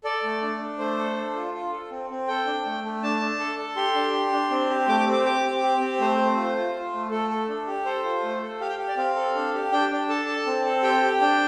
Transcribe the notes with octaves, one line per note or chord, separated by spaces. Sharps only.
A4 D5
A3
D4
D4
A3 C5
A4
D4
F4
F4
A4
C4
C4
A4 G5
D4
A3
A3
D4 A5
D4
A4
A4
G4 C6
D4
G4
D4
C4
G4
A3 D6
D6
C4
D6
G4 D6
C4
G4
C4
A3 C5
A3
F4
F4
F4
A3
A3 A4
A4
D4
G4
A4 C5
F4
A3
A4
G4 F5
G5
G4
D5
C4 F5
A4
D4
G4
D4 G5
D4
A4 A5
A4
C4
A4
G4 G5
G4
D4 G5